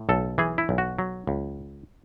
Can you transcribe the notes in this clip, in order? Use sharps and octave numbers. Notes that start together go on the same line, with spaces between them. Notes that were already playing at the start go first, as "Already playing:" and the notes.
Already playing: A2
B1 A4
E3 G#4
E4
B1
F#4
F#3
C#2